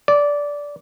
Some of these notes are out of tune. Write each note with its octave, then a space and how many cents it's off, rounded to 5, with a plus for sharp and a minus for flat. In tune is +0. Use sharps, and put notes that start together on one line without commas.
D5 -15